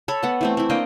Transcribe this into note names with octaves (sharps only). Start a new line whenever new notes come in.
A4 C#5 B5
B3 F#5
E3 A3 C4
C4 E4
A#3 D4 D#5 G5